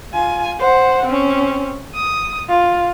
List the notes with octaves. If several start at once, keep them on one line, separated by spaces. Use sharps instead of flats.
F4 G#5
C5 F#5
C4 C#4
D#6
F4